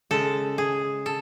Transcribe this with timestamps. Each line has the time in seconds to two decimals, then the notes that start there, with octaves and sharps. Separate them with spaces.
0.11 C#3 G#3 A4
0.58 G#4
1.06 A4